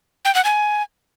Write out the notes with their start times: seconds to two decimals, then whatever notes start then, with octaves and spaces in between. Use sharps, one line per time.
0.25 G5
0.35 F#5
0.45 G#5